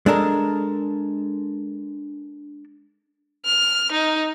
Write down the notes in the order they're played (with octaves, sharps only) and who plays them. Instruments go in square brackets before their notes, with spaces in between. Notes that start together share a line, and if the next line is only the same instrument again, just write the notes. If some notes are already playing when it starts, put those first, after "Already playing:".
[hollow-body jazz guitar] G#3 D4 A4 A#4
[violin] F6
D#4